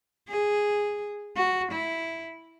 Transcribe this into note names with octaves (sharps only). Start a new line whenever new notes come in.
G#4
F#4
E4